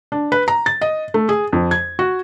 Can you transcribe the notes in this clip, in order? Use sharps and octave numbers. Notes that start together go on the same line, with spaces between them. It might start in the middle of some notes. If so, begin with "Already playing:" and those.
D4
B4
A#5
A6
D#5
A3
G#4
F2
G#6
F#4